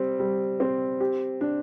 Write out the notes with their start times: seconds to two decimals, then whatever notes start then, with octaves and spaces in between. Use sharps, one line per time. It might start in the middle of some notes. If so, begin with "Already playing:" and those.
Already playing: G3 C4
0.19 G3
0.60 C4
1.00 G4
1.41 D4